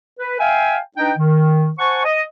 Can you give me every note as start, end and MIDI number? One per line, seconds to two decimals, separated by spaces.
0.19 0.37 71
0.39 0.78 76
0.39 0.78 77
0.39 0.78 79
0.39 0.78 80
0.97 1.12 62
0.97 1.12 63
0.97 1.12 71
0.97 1.12 75
0.97 1.12 79
1.18 1.70 51
1.79 2.04 72
1.79 2.04 78
1.79 2.04 80
1.79 2.04 81
1.79 2.04 85
2.05 2.22 75